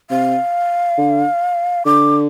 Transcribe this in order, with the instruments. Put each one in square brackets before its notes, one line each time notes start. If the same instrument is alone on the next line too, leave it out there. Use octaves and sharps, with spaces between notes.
[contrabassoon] C3 [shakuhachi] F5
[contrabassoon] D3
[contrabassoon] D3 [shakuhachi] D6